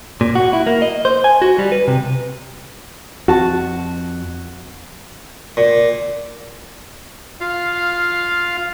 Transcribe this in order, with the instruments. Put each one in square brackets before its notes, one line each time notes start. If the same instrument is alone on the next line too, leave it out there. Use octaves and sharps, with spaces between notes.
[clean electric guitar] A#2
F#4
E4
A#3
D#5
C5
G#5
F#4
G3
B4
C3
[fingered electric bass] F2 [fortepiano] F#4 A5
[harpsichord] A#2
[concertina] F4 F5